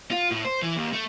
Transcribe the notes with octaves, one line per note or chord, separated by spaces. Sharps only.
F4
A2
C5
E3
D#2
A3